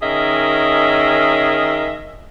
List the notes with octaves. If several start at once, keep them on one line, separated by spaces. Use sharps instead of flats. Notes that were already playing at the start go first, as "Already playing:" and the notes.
D#3 C#4 G#4 A#4 D#5 E5